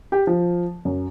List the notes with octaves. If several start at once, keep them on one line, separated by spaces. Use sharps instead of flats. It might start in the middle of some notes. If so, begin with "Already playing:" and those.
G4
F3
F#2